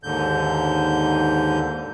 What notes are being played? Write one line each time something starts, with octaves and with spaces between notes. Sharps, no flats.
D#2 G#2 D3 G6